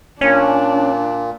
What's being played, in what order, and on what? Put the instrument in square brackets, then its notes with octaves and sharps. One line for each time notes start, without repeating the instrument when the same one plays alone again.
[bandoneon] A#2 [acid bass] C#4 [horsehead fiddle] D4